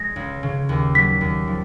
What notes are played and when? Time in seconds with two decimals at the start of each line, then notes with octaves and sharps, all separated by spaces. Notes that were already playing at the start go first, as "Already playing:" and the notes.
Already playing: G#3 A#6
0.16 C#2
0.43 C#3
0.69 D#2
0.95 F#3 B6
1.21 D#2
1.48 F3